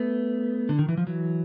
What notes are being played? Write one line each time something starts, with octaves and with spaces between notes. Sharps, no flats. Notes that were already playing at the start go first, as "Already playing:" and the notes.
Already playing: A3 B3
D3
D#3
E3
F3
E3 F#3